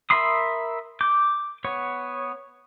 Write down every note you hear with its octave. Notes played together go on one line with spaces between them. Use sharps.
A#4 E5 B5 C6 D#6
D6 G6
B3 C#5